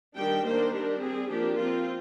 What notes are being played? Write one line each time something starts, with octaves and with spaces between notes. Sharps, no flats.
D#3 G3 D4 G5
D#3 A#3 D4 C5
G3 D4 A#4
G3 C4 G#4
F3 A#3 D4 G4
F3 C4 F4